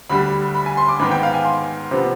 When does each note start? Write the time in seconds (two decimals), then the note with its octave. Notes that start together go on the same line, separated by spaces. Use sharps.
0.10 D2 D3 G3 B5
0.54 B5
0.66 G#5
0.77 C6
0.89 D6
1.00 G#2 D#3 B3 B5
1.11 G5
1.23 F5
1.34 G#5
1.45 C6
1.91 C3 F3 B3